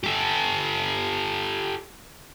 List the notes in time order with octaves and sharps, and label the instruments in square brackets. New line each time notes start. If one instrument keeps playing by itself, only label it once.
[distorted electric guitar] G4 A4